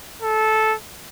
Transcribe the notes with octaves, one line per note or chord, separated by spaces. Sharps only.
A4